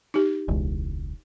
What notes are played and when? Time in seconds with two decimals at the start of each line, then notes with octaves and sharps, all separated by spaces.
0.14 D#4 G4
0.48 E1 C#2